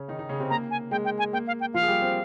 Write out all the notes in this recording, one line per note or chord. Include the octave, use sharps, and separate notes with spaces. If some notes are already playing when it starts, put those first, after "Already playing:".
Already playing: C#3 C#4
D#3 D#4
D#3 D#4
C#3 C#4
C3 C4
A#3 A#5
G#5
G#3 G5
G5
G#5
A#3 G5
F5
G5
F3 F4 F5
G#4
G3 G4
C4 C5